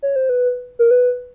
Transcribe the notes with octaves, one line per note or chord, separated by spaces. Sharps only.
C#5
C5
B4
A#4
B4